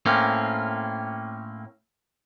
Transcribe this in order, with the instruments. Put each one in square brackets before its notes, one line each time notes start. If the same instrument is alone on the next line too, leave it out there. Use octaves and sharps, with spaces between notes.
[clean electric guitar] A2 A#3 C4 C#4